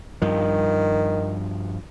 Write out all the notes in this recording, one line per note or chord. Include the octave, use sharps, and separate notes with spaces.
G2 D#3 F3